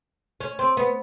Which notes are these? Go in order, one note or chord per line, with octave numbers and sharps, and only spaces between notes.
C#4
C4
B3